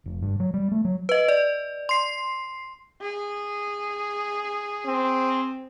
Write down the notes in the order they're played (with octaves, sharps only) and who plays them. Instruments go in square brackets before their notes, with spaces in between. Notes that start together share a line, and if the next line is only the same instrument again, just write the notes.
[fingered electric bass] F1
G2
F#3
G3
A3
F#3
[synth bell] B4 D#5
D5
C6 C7
[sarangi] G#4
[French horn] C4